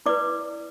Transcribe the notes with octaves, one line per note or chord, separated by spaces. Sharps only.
E4 B4 D5 D6